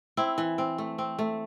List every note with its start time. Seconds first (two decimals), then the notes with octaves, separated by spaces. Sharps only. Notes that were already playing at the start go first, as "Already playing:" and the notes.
0.17 C4 E4
0.38 E3
0.58 C4
0.78 A3
0.98 C4
1.19 A3